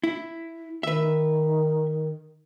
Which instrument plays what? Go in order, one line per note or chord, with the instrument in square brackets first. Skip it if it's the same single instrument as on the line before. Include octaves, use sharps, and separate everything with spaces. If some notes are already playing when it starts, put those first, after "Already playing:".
[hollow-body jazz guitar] E4
[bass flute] D#3 [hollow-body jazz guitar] B4 E5